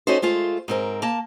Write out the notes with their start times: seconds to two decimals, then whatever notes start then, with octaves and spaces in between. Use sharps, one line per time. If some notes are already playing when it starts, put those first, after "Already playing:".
0.07 C#4 D#4 F#4 A4 C5
0.22 G#3 A3 F4 C5
0.68 G#2 C4 A#4
1.02 A#3 A5